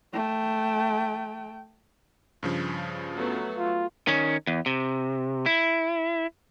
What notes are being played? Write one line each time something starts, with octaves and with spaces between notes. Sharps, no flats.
A3 G5
G2 C#3 F3
F#3 A3 B3
F4
D#3 C#4
E2
C3
E4